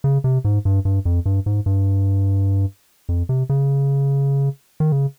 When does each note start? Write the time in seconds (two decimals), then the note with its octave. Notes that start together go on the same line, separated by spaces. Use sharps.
0.04 C#3
0.24 C3
0.45 G#2
0.65 G2
0.85 G2
1.05 F2
1.26 G2
1.46 G#2
1.66 G2
3.09 F2
3.29 C3
3.49 C#3
4.80 D#3
4.92 C#3